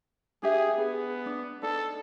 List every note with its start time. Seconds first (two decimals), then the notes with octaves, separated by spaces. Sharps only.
0.43 D4 G4 G#4 E5
0.78 B3 G#4
1.26 D4
1.63 D#4 A4 D5